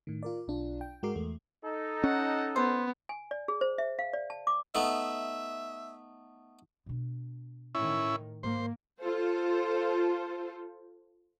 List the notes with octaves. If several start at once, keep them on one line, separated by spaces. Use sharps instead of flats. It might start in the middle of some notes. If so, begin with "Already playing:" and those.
A2 D#3
F4 A#4 D5
B1 D4 F4
G5
G#2 G#3 F#4 A#4 D6 C7
E2 A3
D#4 A4
C#4 F#5
B3 C5
G#5
D5
G#4
C5
E5
F5
D5
A5
D6
A3 B3 D#4 E5
B2 D4
A2 D#3 C#4 E4
G#2 A#3 C5
F4 A4 C5